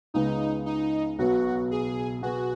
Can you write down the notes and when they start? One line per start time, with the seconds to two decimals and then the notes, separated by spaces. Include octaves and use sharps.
0.14 C#2 C#3 G#3 B3 D#4
0.66 D#4
1.19 B1 B2 F#3 B3 F#4
1.71 G#4
2.22 B2 B3 F#4 G#4